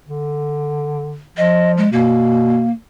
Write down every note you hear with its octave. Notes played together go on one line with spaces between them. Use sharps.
D3
F3 D#5
G#3
B2 A#3